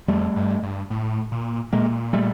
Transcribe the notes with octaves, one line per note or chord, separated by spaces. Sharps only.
F2 G3 A3
G2
G2
A2
A#2
A#2 G#3 A#3
G3 A3